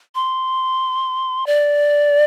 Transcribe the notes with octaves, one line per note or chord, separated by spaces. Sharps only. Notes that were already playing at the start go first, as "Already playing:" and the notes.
C6
D5